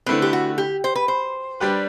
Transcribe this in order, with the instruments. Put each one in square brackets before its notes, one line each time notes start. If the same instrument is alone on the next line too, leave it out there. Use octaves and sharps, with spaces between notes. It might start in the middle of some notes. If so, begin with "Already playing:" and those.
[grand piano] D3 A3 E4 B4 [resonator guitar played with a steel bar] C4
[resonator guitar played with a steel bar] G4
F#4
G4
C5
B4
C5
[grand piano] G3 D4 G4 B4